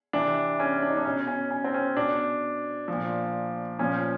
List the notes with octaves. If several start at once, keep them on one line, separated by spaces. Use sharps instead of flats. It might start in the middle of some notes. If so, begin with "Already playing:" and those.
C3 E3 D4
C#4
D4
D#4
D4
B2 C#4
C#4
C#4
C4
C#4
B2 D4
A#2 F3
A#2 F3 C#4